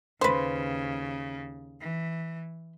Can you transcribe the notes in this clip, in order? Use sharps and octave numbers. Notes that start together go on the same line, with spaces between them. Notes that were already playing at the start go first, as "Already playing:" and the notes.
D#2 C#3 B4 C5
E3